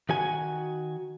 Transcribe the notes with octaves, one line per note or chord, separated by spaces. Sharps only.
D#3 F#4 G#5